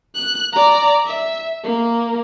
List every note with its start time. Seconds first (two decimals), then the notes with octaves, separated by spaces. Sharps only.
0.15 F#6
0.53 D5 A#5
1.06 E5
1.64 A#3